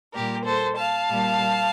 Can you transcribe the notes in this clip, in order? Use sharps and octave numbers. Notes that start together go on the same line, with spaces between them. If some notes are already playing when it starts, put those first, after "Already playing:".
A#2 G3 A#3 G4 A#4
A4 C5
F5 A5
A#2 G3 A#3